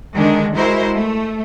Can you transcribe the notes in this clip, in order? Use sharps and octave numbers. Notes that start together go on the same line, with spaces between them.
D3 D#3 G#3 D4
G#3 E4 F#4 A#4 C5
A3